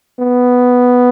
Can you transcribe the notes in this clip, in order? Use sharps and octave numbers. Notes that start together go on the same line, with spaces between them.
B3